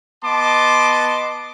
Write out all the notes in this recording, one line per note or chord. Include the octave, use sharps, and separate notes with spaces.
B3 D#5 A5 C6 D6